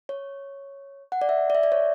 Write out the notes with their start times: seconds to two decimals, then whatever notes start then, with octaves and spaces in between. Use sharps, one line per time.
0.09 C#5
1.12 F#5
1.22 D5
1.29 E5
1.50 D5
1.55 E5
1.63 D5
1.72 C#5